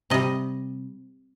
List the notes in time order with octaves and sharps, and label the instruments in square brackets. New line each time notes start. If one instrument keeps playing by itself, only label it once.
[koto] C3 G3 D#5